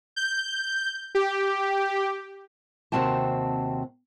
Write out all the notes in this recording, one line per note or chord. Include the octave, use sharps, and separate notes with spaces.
G6
G4
D#2 C3 C4 F#4 G5 A5